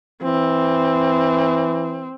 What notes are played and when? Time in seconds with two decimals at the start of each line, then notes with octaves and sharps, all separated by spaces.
0.23 E3 C4